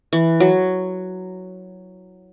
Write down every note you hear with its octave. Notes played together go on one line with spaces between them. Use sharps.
E3
F#3